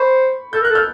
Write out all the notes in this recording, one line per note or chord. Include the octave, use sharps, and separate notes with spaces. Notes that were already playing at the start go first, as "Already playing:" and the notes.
Already playing: C5 B5 C#6
A4 G6
A#4
F#6
A4
F6 G6